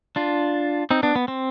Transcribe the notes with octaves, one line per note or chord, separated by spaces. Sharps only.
D4 F4
C4 D#4
B3 D4
B3
C4